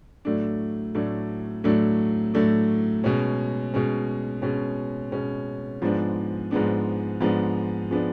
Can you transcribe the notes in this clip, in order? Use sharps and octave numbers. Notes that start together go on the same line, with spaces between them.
A2 F#3 A3 D4
A2 F#3 A3 D4
A2 F#3 A3 D4
A2 F#3 A3 D4
B2 G#3 C#4
B2 G#3 C#4
B2 G#3 C#4
B2 G#3 C#4
G#2 F3 G#3 B3 D4
G#2 F3 G#3 B3 D4
G#2 F3 G#3 B3 D4
F3 G#3 B3 D4